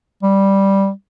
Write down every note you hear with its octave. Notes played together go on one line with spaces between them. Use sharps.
G3